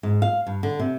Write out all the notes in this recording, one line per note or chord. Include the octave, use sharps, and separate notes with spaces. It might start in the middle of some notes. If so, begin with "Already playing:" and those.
G#2
F5
G2
D3
C3